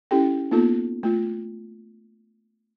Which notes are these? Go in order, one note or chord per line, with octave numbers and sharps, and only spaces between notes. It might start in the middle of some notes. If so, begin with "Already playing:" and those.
C#4 E4 G4 A4 G5
A#3 B3 D#4 F4 A4
A3 F4